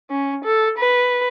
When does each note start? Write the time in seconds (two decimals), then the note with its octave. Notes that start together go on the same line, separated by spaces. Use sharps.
0.10 C#4
0.45 A4
0.78 B4